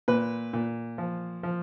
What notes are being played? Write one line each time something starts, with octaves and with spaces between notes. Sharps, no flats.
A#2 B4
A#2
F3
F3